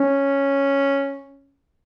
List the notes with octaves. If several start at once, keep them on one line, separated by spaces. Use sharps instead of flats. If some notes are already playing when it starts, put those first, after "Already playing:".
Already playing: C#4